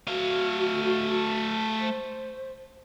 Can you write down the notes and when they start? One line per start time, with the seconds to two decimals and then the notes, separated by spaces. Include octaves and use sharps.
0.07 A3 F#4 F5
1.80 C5